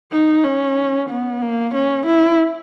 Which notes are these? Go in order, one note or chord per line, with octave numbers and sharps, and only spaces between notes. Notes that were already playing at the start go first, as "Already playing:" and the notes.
D#4
C#4
B3
A#3
C#4
E4